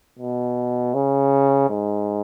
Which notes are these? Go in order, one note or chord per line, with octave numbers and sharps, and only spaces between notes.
B2
C#3
G#2